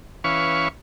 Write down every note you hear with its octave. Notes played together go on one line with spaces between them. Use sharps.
E3 C#4 B4 F5 C#6